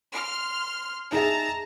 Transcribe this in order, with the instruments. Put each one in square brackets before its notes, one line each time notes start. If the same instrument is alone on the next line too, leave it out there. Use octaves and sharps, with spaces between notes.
[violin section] C6 F6
[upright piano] D#4 G#4 E5 [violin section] A5 A#5